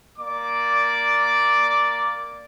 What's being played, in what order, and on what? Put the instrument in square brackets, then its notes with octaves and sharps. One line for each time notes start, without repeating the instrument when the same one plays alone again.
[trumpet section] A#3 D5 D6